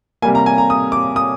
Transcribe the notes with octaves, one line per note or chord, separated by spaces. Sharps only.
C3 G3 A#3 G#5
A#5
G#5
A#5
D#6
D6
D#6